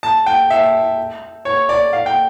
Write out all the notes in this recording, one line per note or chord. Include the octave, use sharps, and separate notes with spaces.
A5
G5
E5
C#5
D5
F5
G5